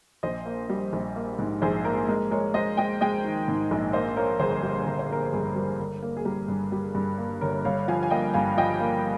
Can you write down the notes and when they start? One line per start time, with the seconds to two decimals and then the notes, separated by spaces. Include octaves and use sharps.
0.23 A#1 C5 D#5
0.46 A#3
0.70 G3
0.93 A#1
1.16 A#3
1.39 G#2
1.62 A#1 G#4 C5
1.85 A#3 A#4
2.08 G#3 A#4
2.31 G#3 A#4 C#5
2.54 G#3 C5 D#5
2.77 G#3 D#5 G5
3.01 G#3 D#5 G5
3.24 D#3
3.48 G#2
3.71 A#1
3.93 A#3 C5 D#5
4.17 A#3 A#4 C#5
4.40 G1 G#4 C5
4.63 G3
4.86 G1 A#4
4.99 C5
5.10 A#3 A#4
5.33 G2 G#4
5.55 G3 A#4
5.79 G1 A#4
6.02 A#3
6.17 G#4
6.25 G3 A#4
6.48 G2
6.72 G3
6.95 G2
7.18 A#3
7.41 G1 A#4 C#5
7.65 G2 C#5 F5
7.88 F3 F5 G#5
8.03 G#5
8.10 A#3 D#5 G5
8.34 G2 F5 G#5
8.57 F3 D#5 G5
8.80 A#3